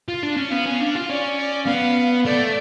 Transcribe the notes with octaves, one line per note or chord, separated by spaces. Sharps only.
F4
D4
C#4
B3 F5
C#4
D4
F4
C#4 D5
D5
B3 F5
A3 D5